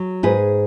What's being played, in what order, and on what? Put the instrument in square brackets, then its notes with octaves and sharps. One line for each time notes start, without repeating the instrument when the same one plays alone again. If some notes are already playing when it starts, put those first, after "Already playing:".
Already playing: [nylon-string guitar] F#3
G#2 G#4 B4